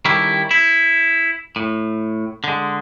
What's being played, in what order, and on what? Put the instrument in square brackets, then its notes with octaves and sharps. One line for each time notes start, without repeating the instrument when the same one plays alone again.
[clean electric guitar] D#3 G3 C#4 E4 G4 A4
E4
A2
D3 G#3